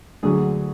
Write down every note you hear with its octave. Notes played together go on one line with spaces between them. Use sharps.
D2 D3 F#3 G#4